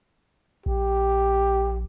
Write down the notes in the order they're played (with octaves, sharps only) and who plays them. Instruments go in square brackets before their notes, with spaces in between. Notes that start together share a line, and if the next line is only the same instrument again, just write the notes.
[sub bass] A#1 [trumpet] G4